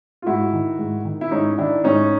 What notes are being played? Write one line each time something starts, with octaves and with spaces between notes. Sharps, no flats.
F4
G#2 E4 F#4
D#3
G#2
D#3
E4
G#2 C#4 D#4
D#3 D4 E4
G#2 C#4 D#4